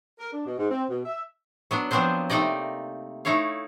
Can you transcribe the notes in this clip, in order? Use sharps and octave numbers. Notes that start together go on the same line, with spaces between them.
A#4
D4
B2
G#2
C4
B2
E5
F#3 B3 D4
F3 F#3 B3 C4 D4 C5
C3 A3 A#3 D#4 D5 D#5
A3 D#4 E4 C#5 F5